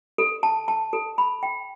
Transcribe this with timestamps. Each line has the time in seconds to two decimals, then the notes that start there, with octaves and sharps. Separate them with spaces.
0.18 A4
0.43 A5
0.68 A5
0.93 A4
1.18 B5
1.43 G5